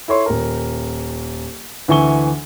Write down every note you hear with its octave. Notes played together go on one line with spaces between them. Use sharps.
E4 A4 C#5 C6
D#1 A#4
D2 E3 E5 G#5 C#6 G7